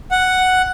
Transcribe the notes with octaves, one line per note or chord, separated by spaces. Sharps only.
F#5